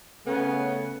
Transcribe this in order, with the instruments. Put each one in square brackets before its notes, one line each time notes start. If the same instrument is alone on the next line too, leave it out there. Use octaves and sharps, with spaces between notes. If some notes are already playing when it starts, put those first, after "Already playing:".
[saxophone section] C#3 A3 B3 C#4